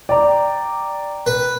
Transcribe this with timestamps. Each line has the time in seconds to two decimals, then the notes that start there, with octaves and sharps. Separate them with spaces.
0.09 D5 G5 A#5
1.26 B4